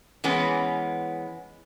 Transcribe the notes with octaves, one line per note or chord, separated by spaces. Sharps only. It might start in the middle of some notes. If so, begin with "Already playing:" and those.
E3 G#3 B3 C#4